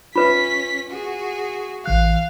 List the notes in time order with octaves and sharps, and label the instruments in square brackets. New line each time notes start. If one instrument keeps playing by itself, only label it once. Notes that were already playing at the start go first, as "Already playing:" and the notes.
[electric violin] C#4 B6 [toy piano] F4 B4 E5
[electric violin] F#4 G#4
[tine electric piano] A1 E3 F#6 [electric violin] F5